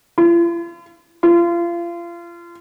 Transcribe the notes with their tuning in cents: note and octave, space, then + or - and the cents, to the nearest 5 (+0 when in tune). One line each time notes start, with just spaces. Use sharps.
F4 -45
F4 -30